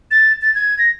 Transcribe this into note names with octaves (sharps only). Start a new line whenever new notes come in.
A6
A6
G#6
A#6